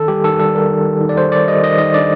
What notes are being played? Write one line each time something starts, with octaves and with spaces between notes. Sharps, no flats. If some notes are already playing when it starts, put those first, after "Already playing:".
Already playing: D#3 A4
G3 G4
D#3 A4
G3 A4
G3 A#4
D#3
D#3
D#3
D5
D#3 C5
G3 D5
G3 D#5
D#3 D#5
D#3 D#5
D4 D5